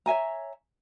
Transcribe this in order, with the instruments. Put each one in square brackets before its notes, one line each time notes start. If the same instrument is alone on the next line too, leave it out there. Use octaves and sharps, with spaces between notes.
[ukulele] C#5 E5 G#5 A#5